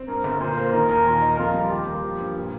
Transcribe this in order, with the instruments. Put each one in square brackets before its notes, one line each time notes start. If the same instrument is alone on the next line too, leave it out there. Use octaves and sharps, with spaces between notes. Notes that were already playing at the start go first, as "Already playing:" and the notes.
Already playing: [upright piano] C4
[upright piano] G2 [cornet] A#4
[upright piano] G1
[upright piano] A#2 [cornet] C5
[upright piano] A#3
[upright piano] D#3 [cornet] A#4
[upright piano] D#2
A#2
D#4
[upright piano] F2 [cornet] F4
[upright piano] G3
[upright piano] D#2 [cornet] G4
[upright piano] A#3
F3
G2
A#2